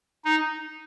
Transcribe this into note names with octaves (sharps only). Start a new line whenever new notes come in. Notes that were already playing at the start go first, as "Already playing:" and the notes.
D#4